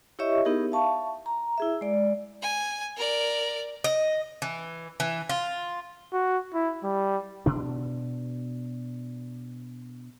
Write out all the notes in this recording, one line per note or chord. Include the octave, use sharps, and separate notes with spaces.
E4 G4 C#5 D#5 E5 C#6
B3 D#4 E4 G4 G#4 A#4
E5 F5 A5 C#6
A#5
E4 G#4 E5
G#3 D5
G#5
A#4 D5
D#5
E3
E3
F4
F#4
E4
G3
B2 D4